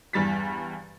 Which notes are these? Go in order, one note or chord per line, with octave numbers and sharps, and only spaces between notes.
E2 G2 G3 A6 B6